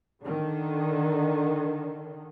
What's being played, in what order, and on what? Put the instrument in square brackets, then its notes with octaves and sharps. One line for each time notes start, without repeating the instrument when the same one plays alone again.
[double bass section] D3 D#3